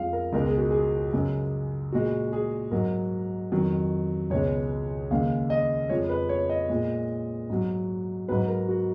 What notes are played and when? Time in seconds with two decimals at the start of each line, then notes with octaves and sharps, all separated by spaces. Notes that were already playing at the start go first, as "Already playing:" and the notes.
Already playing: F2 F3 G#3 F5
0.13 A#4
0.33 C#2 B2 G#3 A#4
0.46 G#4
0.58 F#4
0.71 G#4
1.13 F#2 C#3 G#3
1.92 A#2 G#3 F#4
2.33 G#4
2.71 G#2 F#3 A#4
3.51 F2 D#3 F#3
4.30 C#2 B2 G#3 C#5
5.10 D#2 C#3 G#3 F5
5.50 D#5
5.89 F2 F3 G#3 C#5
6.09 B4
6.29 C#5
6.50 D#5
6.69 A#2 G#3
7.50 G#2 F#3
8.29 G#2 F#3 B4
8.48 A#4
8.69 F#4